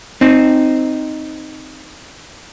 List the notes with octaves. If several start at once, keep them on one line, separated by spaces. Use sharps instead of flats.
C4 D#4